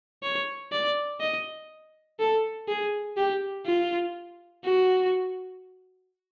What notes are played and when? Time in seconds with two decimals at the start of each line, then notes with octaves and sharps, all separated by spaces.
0.23 C#5
0.72 D5
1.21 D#5
2.20 A4
2.68 G#4
3.17 G4
3.66 F4
4.64 F#4